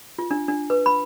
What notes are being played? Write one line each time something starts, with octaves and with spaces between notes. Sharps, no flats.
F4
D4
D4
B4
B5